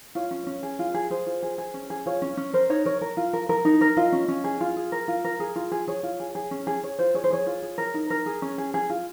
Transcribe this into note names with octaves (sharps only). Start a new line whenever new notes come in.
F4 C#5
C#4
C#4
G#4
F4
G#4
G#4 C5
F4
G#4
G#4
C#4
G#4
F4 C#5
C#4
C#4
A#4 C5
D#4 C#5
A#4 C#5
A#4
F4
A#4
A#4
D#4
A#4
F4 D#5
C#4
C#4
G#4
F4
G#4
A#4
F4
A#4
G#4
F4
G#4
G#4 C#5
F4
G#4
G#4
C#4
G#4
G#4 C#5
F4 C5
G#4 C#5
C5
G#4 C#5
F4
G#4
A#4
D#4
A#4
G#4
C#4
G#4
G#4
F4